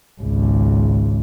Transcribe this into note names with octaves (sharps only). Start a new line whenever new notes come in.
G#1 C#2